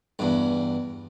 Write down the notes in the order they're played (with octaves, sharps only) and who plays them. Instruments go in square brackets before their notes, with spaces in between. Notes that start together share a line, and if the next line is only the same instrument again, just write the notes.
[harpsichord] E2 G2